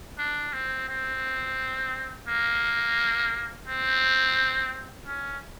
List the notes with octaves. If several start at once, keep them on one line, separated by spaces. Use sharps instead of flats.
D4
C4
C4
A#3
C4
C#4